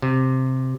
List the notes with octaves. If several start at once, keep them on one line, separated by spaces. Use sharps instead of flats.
C3